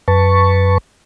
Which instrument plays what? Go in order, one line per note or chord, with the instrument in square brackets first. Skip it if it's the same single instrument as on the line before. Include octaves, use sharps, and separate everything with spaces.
[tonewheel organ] F#2 B4 A5 C#6